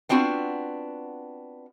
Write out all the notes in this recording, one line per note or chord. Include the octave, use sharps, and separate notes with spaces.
B3 C4 D4 F4 F#4